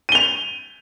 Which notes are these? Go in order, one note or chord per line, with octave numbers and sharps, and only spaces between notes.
D#7 F7 G7